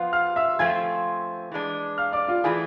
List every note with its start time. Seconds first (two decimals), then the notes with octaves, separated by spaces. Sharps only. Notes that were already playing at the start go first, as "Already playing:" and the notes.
Already playing: F3 B3 F4 F5
0.13 F5 F6
0.36 E5 E6
0.59 F3 A3 C4 F4 G#5 G#6
1.52 E3 G#3 D4
1.98 F5 F6
2.13 D5 D6
2.28 F4 F5
2.44 E3 A3 E4 G#4 G#5